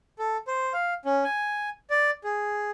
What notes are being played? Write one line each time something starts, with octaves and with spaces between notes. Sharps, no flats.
A4
C5
F5
C#4
G#5
D5
G#4